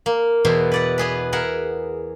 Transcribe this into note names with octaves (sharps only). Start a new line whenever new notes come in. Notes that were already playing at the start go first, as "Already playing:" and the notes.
A#3
E2 B2 E4 C5
B4 D5 F#5
B3 G#4 B4
G#4 A#4 E5 F#5